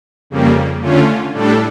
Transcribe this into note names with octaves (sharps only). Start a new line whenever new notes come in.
F2 C#3 G3 A#3
D3 A3 C#4 F4
A2 G3 D4 A4